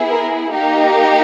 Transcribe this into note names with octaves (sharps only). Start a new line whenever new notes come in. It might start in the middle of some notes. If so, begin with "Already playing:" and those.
Already playing: B3 E4 G#4
A#4
A#3 D#4 G4